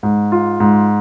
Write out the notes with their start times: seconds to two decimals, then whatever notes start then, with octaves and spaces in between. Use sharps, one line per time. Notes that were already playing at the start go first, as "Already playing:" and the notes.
0.03 G#2
0.32 F4
0.60 G#2